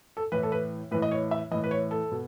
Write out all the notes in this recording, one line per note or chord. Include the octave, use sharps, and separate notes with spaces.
A4
A2 E3 B4
A4
B4
A2 E3 B4
D#5
C#5
E5
A2 E3 D#5
B4
C#5
A4
B2